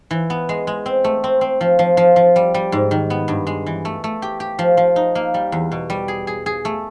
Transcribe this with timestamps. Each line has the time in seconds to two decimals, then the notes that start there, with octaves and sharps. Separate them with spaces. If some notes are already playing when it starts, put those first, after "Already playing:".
0.11 E3
0.30 B3
0.49 G#3
0.67 G#3
0.86 C4
1.04 A3
1.24 C4
1.41 C4
1.61 F3
1.79 F3
1.97 F3
2.16 F3
2.36 G3
2.54 G3
2.72 G#2
2.91 D#3
3.10 B3
3.28 G2
3.47 G#3
3.67 E3
3.85 A3
4.04 A3
4.22 G4
4.40 G4
4.59 F3
4.77 F3
4.96 D#4
5.15 A#3
5.34 G3
5.52 E2
5.72 B2
5.90 G3
6.08 G#4
6.27 G#4
6.46 G#4
6.65 A3